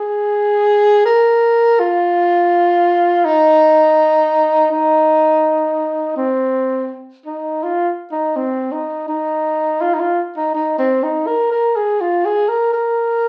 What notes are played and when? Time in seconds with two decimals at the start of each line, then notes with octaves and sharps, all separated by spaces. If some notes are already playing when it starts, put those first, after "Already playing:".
Already playing: G#4
1.06 A#4
1.80 F4
3.25 D#4
4.71 D#4
6.17 C4
7.26 D#4
7.63 F4
8.12 D#4
8.36 C4
8.72 D#4
9.08 D#4
9.81 F4
9.94 D#4
10.00 F4
10.37 D#4
10.55 D#4
10.79 C4
11.03 D#4
11.27 A#4
11.52 A#4
11.76 G#4
12.01 F4
12.25 G#4
12.49 A#4
12.73 A#4